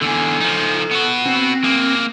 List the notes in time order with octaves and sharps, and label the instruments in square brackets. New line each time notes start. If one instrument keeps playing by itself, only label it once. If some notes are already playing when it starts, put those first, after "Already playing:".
[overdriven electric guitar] E2 D3 [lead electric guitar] A4 G#5
[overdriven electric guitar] F3 D#4
B3 F#4
[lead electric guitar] C4
[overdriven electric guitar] A#3 G#4